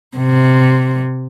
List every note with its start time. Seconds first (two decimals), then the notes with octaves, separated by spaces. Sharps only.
0.17 C3